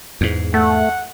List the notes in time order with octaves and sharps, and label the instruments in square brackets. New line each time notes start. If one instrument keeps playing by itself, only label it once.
[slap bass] E2 G#2
[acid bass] A3 [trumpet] F#5